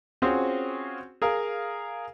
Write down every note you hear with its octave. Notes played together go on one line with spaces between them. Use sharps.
C4 C#4 F4 F#4 G#4 C5
G#4 A#4 F5